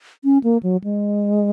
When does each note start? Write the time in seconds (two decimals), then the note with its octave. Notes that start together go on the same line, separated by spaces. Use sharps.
0.24 C#4
0.44 A#3
0.63 F#3
0.84 G#3